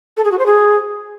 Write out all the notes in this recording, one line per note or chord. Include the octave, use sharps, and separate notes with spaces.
A4
G#4
F#4
C5
G#4